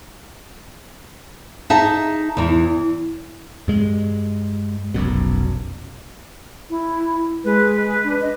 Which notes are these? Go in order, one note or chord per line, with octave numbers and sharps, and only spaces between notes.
D#4 G#4 E5 G#5 A5
E2 E3
G2 G#3
F1 B1 F#2 B2
E4
G#3 B4
D4
D#5